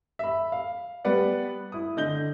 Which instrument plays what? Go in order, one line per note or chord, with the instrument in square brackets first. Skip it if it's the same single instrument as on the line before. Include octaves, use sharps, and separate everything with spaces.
[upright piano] E5 B5
F5
G3 B3 B4 D5 F#5
E4 D#6
D3 D#5 G6 G7